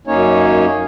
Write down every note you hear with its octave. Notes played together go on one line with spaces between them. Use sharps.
F#2 A#3 C#4 D#4 C#5